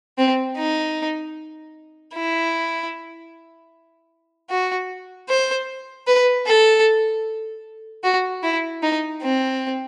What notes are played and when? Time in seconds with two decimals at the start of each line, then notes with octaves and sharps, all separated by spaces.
0.18 C4
0.58 D#4
2.14 E4
4.50 F#4
5.29 C5
6.07 B4
6.46 A4
8.04 F#4
8.43 E4
8.83 D#4
9.22 C4